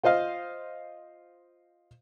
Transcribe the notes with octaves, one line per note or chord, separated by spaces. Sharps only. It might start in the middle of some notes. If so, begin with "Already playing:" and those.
F4 C5 D#5 F5